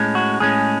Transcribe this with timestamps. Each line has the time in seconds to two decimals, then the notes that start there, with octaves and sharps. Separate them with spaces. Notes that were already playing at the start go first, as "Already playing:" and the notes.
Already playing: A2 G#3 C#4
0.15 F#4
0.40 A2 G#3 C#4 G#4